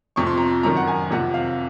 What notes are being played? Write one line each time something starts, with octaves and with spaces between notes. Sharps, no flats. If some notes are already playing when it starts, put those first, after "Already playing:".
F2 C3 F3 C#6
C6
A#5
C6
F#2 D#3 A#5
F#5
G#5
F2 C3 F3 F#5
F5